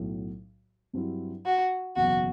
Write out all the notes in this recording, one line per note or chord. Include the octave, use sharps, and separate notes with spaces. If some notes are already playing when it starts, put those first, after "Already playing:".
Already playing: B1 A2 F#3
G2 F#3 C4 E4 G4
F#4
F#1 E2 B2 F#3 F#4